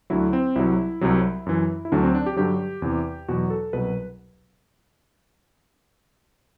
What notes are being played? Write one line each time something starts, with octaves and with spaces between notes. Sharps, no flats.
D2 D3 F#3 E4
C4
C2 C3 F#3 E4
C2 C3 F#3
F#2 E3
E4
D2 D3 F#3 D4
C4
D4
G4
G2 D3 F#3 G4
E2 C3 E3
E2 B2 F#3 F#4
A4
C2 B2 F#3 B4